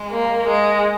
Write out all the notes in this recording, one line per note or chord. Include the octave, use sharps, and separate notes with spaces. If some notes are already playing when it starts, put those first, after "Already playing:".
Already playing: G#3
A#3
G#3